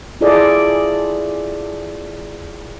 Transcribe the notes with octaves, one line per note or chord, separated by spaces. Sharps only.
E4 F4 G#4 A4 D5 D#5